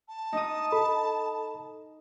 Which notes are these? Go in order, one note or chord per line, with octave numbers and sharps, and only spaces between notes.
A5
D#4 D#6
A4 B5